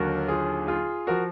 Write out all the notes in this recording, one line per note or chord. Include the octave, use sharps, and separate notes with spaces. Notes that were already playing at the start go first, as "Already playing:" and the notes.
Already playing: D#2 D3 F#3 F#4 A#4
F4 G#4
F4 G#4
F3 F#4 A#4